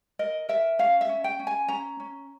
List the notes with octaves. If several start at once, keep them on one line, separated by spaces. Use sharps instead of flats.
A#4 D#5
A#4 E5
C#4 F5
E5
C#4
G5
C#4
G#5
C#4 A#5
C#4